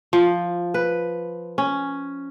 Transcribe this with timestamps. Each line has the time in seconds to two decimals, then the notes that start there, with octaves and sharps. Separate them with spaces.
0.13 F3
0.74 B4
1.58 C#4